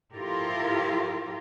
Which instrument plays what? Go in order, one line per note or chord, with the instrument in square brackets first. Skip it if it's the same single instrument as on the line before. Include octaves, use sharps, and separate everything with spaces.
[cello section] F3 E4 F4 G4 A4 A#4